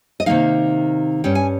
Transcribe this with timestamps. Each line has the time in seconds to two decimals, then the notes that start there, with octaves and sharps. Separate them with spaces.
0.20 D#5
0.26 C3 D#3 A#3 D#4 F5
1.24 G2 G3 C#4 G5
1.35 G#5